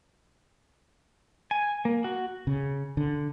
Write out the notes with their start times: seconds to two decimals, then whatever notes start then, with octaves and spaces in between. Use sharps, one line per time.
1.51 G#5
1.85 A#3
2.04 F#4
2.47 C#3
2.97 D3